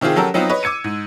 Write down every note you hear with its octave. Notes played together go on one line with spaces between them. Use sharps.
C3 D#3 C4 F4 G#4
F#3 C#4 G4 A4 A#4 F#5
F#3 B3 C4 D#4 F4 F#4
B4 C#5 D#5
D6 E6 G#6 C#7 D#7
G#2